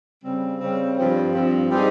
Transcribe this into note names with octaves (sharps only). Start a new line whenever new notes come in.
C#3 G3 C4
C#3 G3 C4
G2 F3 C4
G2 F3 C4
G3 C4 D#4 G#4